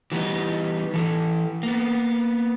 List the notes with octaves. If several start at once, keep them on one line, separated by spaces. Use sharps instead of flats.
E3 G3 B3 D#4
E3 A4
A#3 B3